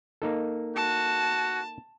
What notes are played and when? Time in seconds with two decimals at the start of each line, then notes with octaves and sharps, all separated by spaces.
0.22 A#3 D#4 A4
0.76 F#4 A5